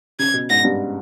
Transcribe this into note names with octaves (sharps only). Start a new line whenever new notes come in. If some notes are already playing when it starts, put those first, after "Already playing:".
C#3 G#6
B2
G#2 A#6
G2